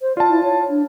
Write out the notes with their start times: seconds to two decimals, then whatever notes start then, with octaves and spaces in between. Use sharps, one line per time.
0.01 C5
0.17 F4 D5 A5
0.29 E4
0.43 C#5
0.69 D4